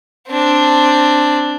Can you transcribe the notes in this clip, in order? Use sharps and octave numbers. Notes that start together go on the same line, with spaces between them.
C4 D4